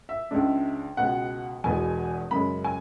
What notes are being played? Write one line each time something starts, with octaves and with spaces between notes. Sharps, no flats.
E5
C#2 C#3 G#3 D4
C#2 B2 G#3 B3 F#5
E1 E2 B2 G#3 B3 G#5
F#2 C#3 G#3 B5
G#5